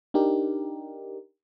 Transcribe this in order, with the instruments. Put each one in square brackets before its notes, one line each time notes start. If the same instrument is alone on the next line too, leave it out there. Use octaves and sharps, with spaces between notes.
[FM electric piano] D4 D#4 G4 A#4